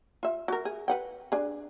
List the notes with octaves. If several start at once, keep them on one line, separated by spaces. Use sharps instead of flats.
F4 E5
F#4 A#4
G#4
B4 F#5 G5
D4 G#4